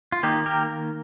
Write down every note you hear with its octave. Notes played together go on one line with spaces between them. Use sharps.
F4
D#3 A#3 D#4 G4
G4 A#4